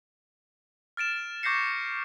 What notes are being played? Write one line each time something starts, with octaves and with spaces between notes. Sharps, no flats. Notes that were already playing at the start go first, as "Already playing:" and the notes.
F6 A6 D7 E7
C#6 D6 G6 A#6 C7 C#7